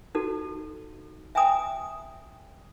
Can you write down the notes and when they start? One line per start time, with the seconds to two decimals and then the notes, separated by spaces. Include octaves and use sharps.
0.15 D#4 F#4 A4
1.35 E5 G5 G#5 A#5 D#6